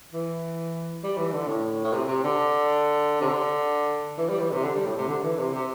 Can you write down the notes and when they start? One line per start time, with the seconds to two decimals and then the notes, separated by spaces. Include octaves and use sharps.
0.13 E3
1.03 G3
1.18 E3
1.33 D3
1.48 A2
1.84 A2
1.93 C3
2.08 C3
2.24 D3
3.21 C3
3.28 D3
4.18 E3
4.29 G3
4.40 E3
4.52 C3
4.64 D3
4.75 G3
4.86 A2
4.97 C3
5.08 D3
5.23 E3
5.38 C3
5.54 C3